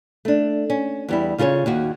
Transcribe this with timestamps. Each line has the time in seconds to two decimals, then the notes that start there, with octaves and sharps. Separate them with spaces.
0.25 A3 D4
0.70 C#4
1.09 E2 G3 E4
1.38 C#3 F4 G#4 A#4 C#5
1.66 D#2 D#4 F#4